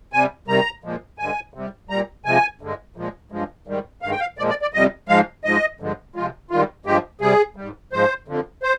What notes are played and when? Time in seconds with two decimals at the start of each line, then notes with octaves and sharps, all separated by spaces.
0.13 C3 G3 G#5
0.47 C3 D#3 G3 A#5
0.84 A#2 F3 G#3
1.19 G2 D3 G#3 G#5
1.54 C3 G3
1.90 A#2 G3 A#5
2.25 C3 F3 G#3 G#5
2.61 G2 D3 G#3
2.96 A#2 F3 G#3
3.32 G2 F3 G#3
3.67 G#2 D#3 G3
4.02 G2 D#3 G#3 F5
4.12 G5
4.20 F5
4.38 A#2 F3 G#3 D5
4.49 D5
4.62 D5
4.74 F2 C3 G3 D#5
5.08 G#2 F3 G#3 F5
5.45 G#2 F3 G#3 D#5
5.80 G2 D3 F3 G#3
6.15 C3 F3 G#3 F4
6.51 G#2 D#3 G3 F4
6.85 G2 F3 G#3 G4
7.21 C3 G3 G#4
7.56 G#2 G3
7.92 G#2 F3 G#3 C5
8.28 F2 D3 F3
8.63 C5